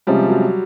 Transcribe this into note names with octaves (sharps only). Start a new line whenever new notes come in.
C3 F3 G3 G#3 C#4
F#3